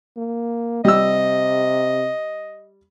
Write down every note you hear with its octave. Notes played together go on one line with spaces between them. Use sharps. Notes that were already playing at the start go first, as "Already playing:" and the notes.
A#3
C3 G3 D#5 E6